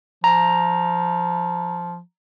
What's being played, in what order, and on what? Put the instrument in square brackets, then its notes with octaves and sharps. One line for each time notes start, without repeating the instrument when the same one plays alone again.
[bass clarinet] F3 [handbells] A#5